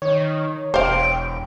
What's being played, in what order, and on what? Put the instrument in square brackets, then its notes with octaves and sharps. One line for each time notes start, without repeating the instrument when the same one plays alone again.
[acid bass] D#3 [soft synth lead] C#5
[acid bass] E1 [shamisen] C5 F5 [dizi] G5